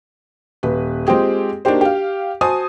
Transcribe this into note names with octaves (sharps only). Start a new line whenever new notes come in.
D#1 B4
G#3 C4 F4 G4 G#4
A#3 D4 D#4 F#4 G4 C5
G4 F5
F#4 C5 G#5 A5 D#6